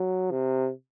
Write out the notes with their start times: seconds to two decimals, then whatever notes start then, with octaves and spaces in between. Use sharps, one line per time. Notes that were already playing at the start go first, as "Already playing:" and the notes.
Already playing: F#3
0.31 C3